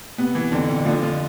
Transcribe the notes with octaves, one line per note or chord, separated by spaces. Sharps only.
C3 B3
E3
F2 D3 D4
F2
D3 F3 F4
F2 F3 F4